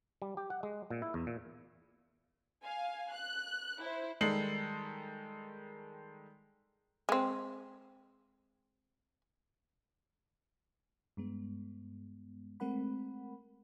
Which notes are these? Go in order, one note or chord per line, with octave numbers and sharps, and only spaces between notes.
G3
G4
F#5
G#3
A#2
E4
E2
A#2
F5 G#5
F#6
E4 C5
D#3 G3 G#3 A4 C7 F#7
G#3 C4
G2 G#3 B3
G#3 A3 C4 A#4 F#5 B5